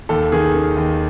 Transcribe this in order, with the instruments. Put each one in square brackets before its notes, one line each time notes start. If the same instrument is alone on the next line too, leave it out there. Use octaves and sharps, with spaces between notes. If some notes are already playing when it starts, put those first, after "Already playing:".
[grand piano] D#2 A4
D#3 G#4
D#3
D#2